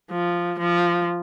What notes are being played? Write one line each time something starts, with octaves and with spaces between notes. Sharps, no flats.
F3
F3